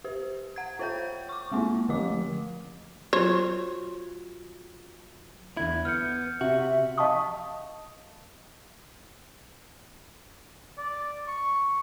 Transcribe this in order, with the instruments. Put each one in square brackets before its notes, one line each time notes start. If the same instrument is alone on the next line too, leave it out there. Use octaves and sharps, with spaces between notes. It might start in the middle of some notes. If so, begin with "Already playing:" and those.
[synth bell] G4 C5
F#5 G#6
F4 C5 C#5 G5 G6
C#6 D6
G#3 A#3 C4 E4 F4
D3 F3 A3 G4 D#5 D6
[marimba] F#3 F4 F#4 [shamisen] C5 C#5
[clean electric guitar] E2 D3 E4 [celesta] G#6
[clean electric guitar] B3 [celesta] F6 G6 C#7
[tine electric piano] C3 [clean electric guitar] F#4 [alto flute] E5
[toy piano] D#5 F5 A5 C6 C#6 D#6
[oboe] D5
C#6